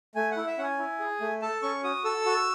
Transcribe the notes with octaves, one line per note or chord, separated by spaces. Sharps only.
A3 G#5
F#5
E4
E5
C#4 F#5 G#5
E4
G#4
A3
A4 A5
C#4 C#6
F#4 D#6
A4 E6
F#4